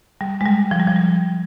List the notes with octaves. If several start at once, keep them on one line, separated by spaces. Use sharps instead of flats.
G3
G#3
G3
F3
G3
F3
G3